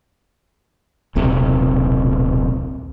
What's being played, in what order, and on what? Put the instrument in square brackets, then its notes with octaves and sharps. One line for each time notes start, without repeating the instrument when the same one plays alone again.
[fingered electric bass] D#1 B1 C3